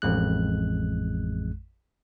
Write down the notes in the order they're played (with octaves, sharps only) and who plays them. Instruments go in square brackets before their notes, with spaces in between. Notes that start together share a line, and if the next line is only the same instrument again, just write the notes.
[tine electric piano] A1 F2 G#3 F#6